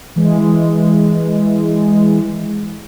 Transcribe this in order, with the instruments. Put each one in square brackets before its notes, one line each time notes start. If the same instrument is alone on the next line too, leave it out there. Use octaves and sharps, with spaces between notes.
[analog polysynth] E3 G#3